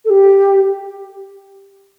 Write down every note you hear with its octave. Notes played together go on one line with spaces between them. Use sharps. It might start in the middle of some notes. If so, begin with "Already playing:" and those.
A4
G4